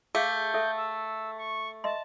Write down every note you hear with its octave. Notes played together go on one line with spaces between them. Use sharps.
A3 G#4 F5 G6
A4 E5
E6
C#6
D#5 E5 A5 C6